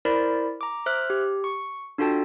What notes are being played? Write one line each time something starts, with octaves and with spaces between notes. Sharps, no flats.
E4 A#4 C5 D5 B5
A#5 D6
C5 E5 F6 F#6
G4
C#6
D4 F4 F#4 A4 G5 A5